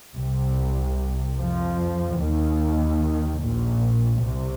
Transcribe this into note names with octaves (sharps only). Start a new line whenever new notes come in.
C2 C3
F2 F3
D#2 D#3
A#1 A#2
C2 C3